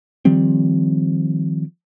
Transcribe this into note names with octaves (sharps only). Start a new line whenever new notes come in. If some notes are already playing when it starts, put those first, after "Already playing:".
D#3 F3 G3 C4